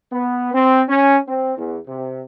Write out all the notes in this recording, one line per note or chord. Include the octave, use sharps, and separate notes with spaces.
B3
C4
C#4
C4
E2
C3